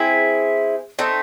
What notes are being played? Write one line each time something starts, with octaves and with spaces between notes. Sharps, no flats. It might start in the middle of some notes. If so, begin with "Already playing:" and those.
Already playing: C4 E4 G#4
A3 C4 D#4